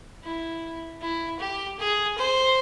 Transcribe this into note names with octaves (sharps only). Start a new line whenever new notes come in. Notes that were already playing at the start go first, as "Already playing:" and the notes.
E4
E4
G4
G#4
C5